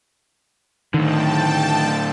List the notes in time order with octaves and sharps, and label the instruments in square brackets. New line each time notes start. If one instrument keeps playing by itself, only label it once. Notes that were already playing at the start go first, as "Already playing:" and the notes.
[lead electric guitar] A2 D3 [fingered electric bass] D#3 [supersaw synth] G5 A5